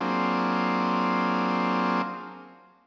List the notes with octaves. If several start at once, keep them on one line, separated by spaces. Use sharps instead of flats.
F#3 A#3 C4 D4 F4 G#4